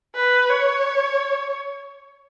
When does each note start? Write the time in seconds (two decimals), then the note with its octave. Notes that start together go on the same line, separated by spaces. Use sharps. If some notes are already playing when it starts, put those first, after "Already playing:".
0.15 B4
0.49 C#5